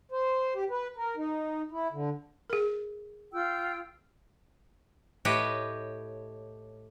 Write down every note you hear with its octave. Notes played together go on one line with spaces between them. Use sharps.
C5
G4
B4
A#4
D#4
E4
D3
G#4 A#4
F4 G5 E6
A2 G4 B4 C#5 D#5